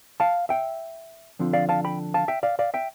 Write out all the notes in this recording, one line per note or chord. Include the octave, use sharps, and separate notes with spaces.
F5 A5
E5 G5
D3 F3 C4 F4
D5 F5
F5 A5
G5 B5
F5 A5
E5 G5
D5 F5
D5 F5
E5 G5